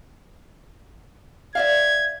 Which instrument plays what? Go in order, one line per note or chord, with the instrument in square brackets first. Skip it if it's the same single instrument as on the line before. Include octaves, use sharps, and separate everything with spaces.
[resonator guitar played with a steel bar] D5 E5 F5 [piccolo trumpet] G#6